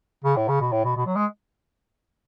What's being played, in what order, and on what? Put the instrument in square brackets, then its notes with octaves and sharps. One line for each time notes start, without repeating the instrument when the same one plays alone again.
[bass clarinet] C#3
A2
C#3
B2
A2
B2
B2
F#3
G#3